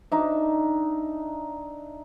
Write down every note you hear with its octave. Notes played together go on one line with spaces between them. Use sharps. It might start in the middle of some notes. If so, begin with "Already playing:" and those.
D4 D#4 E5